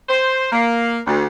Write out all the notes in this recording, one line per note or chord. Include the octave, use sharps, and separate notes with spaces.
C5
A#3
D2